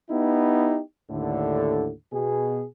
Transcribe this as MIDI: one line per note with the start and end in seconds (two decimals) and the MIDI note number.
0.10 0.80 59
0.10 0.80 63
0.10 0.80 64
0.10 0.80 67
1.10 1.91 39
1.10 1.91 45
1.10 1.91 50
2.13 2.65 47
2.13 2.65 68